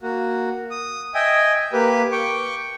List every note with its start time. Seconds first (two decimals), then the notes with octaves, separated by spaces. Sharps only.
0.02 A#3 F#4
0.71 D#6
1.15 D#5 E5 G5 G#5
1.73 A#3 G4 B4
2.12 G5 C#6 D6